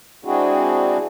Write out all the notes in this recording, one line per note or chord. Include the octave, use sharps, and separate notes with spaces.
G#3 C4 D4 E4 F#4 G#4